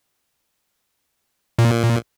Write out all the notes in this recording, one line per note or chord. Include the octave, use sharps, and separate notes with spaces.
A#2